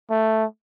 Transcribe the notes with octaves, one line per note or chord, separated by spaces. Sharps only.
A3